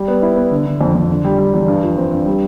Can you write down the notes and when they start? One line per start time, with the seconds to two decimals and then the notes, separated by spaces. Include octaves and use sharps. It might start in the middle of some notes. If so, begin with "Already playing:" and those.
Already playing: G3
0.08 B3
0.22 E4
0.37 B3
0.51 D3
0.66 D3
0.81 F2
0.95 F2
1.10 D3
1.24 G3
1.38 G3
1.54 E2
1.68 G2
1.83 F3
1.98 C4
2.12 G2
2.26 G3